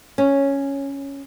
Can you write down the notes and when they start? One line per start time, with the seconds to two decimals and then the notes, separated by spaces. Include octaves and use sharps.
0.18 C#4